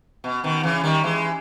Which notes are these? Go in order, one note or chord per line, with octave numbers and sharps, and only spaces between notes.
B2
B2 D#3
C#3 E3
D#3 G3
E3 G#3